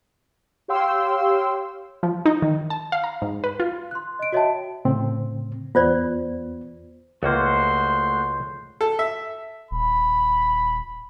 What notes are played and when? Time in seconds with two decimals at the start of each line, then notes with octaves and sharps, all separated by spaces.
0.68 G4 C#5 F5 G5 C6 E6
2.03 F3
2.26 D#4
2.42 D#3
2.70 A5
2.92 F5
3.04 A#5
3.22 G#2
3.44 B4
3.60 F4
3.91 C6 F#6
4.19 D#5 D7
4.32 F#4 C#5 D#5 E5 G5 A5
4.85 A2 C#3 C4
5.75 E2 B3 F4 C5 D5
7.23 C#2 A3 A#3 F#4 C5 C6
8.81 A4
8.99 E5
9.71 D#1 B5